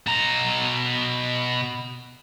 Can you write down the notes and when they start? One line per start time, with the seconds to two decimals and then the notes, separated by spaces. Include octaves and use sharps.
0.07 B2 A#5